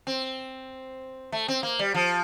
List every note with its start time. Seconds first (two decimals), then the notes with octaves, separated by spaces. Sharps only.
0.07 C4
1.32 A3
1.48 C4
1.63 A#3
1.79 G3
1.94 F3